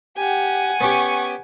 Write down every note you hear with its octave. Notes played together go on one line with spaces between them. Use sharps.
G4 F#5 G#5
B3 C#4 G4 C#6